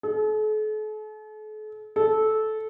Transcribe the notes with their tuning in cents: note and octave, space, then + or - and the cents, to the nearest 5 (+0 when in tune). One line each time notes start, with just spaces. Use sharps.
A4 -45
A4 -15